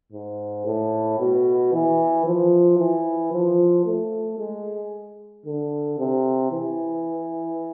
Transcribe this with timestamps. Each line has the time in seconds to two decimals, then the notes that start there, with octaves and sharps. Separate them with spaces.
0.12 G#2
0.65 A2
1.19 B2
1.73 E3
2.26 F3
2.78 E3
3.32 F3
3.86 A3
4.39 G#3
5.46 D3
5.98 C3
6.52 E3